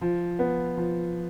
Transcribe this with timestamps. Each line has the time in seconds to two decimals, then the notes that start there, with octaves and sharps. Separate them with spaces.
0.01 F3
0.39 B3
0.77 F3